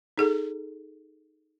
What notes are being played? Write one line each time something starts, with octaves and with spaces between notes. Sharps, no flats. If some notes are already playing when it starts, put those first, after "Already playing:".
D#4 G#4 A4